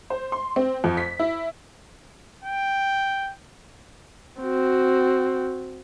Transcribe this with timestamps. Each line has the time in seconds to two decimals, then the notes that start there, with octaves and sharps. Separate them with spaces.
0.10 C5
0.32 C6
0.56 C4
0.84 F2
0.97 B6
1.19 E4
2.44 G5
4.41 C4 F#4